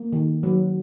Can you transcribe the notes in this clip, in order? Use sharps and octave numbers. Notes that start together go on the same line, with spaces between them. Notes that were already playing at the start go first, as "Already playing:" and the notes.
Already playing: A#3
D#3
F#3